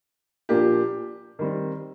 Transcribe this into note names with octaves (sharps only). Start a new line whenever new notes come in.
A#2 F3 A#3 D4 G4
D#3 G3 C4